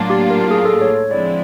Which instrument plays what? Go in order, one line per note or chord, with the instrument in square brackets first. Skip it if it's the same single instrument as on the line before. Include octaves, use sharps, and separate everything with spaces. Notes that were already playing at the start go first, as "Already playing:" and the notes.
Already playing: [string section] A2 F#3 A#3 D4 F4
[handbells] G4
A#4
G#4
A4
C#5
[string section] D3 F3 G#3 C4 E4 [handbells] D5